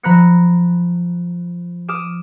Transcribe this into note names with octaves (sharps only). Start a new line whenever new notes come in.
F3 A#5 B5 F#6 A#6 C#7
D6 D#6 F6 D7 E7